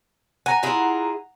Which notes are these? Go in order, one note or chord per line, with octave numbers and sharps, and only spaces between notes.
F#5 G#5 A#5
E4 F4 G#4